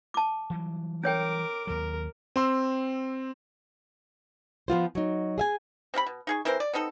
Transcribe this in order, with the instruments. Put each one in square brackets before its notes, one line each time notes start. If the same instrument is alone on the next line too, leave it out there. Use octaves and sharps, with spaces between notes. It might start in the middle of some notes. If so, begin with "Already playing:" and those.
[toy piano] A5 D6
[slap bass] E3 F#3 G3
[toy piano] C#4 C#5 G5 [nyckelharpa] A#4 D6
[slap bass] D#2 F#3 [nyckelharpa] A#4
[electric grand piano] C4 C6 E6
[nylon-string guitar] F3 B3 F4 C5
F#3 D#4
G#4 E5 G#5
[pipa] C4 G4 F5 B5
B2
D#4 G#4 C#6
E3 C4 A#4 C5
D5
B3 C4 D#4 A4